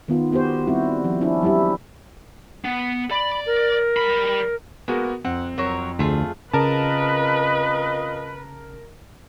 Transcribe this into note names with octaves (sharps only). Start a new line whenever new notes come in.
D#3 B3 F4
B3 F#4 G4 C5
G3 C4 E4 F#4
F3
C#4 D4 E4
F#3 G3 E4 G4
B3
D5 B5
A#4
G3 B5
G#3 A#3 B3 F#4 A#4
F2 C4 F#5
F2 F#3 A#4 C#5
D2 A3 F4 G#4
C#3 C4 F4 A#4 B4 D#5 A5